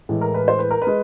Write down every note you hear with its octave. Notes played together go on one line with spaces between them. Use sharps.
A2 E3 G#3
A#4
B4
C5
B4
A#4
B4
G#3